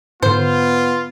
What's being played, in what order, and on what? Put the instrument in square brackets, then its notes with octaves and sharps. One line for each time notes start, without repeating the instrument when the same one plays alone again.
[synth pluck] G#2 D3 [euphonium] B3 [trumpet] F4 [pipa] C5